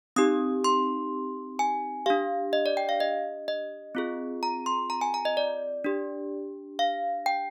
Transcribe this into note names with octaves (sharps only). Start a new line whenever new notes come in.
C4 D#4 G4 D#6
C6
G#5
D4 G4 F5
D#5
D5
G5
F5
D#5
D#5
C4 F4 G#4
A#5
C6
A#5
G#5
A#5
D#5
D5
D4 G4
F5
G5